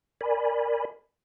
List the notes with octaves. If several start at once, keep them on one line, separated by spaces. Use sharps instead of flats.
A#4 D5 G#5 B5